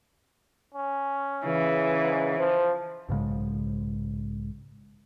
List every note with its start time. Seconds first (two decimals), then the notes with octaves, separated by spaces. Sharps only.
0.74 C#4
1.46 C#3 E3
2.02 G#2
2.39 F3 C5
3.09 B1 G#2 C#3 G#3